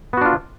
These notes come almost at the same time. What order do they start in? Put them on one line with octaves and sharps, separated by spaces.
B3 F#4 D4 F4